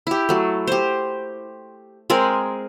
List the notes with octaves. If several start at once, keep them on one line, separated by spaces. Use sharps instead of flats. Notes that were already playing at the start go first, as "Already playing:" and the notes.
E4 G4
F#3 A3
G4 C5
G#3 C4 G#4 A#4